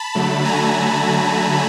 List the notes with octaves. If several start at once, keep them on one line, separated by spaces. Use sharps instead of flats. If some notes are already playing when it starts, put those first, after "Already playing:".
Already playing: A5 B5
D3 F#3 A3
G#5 A#5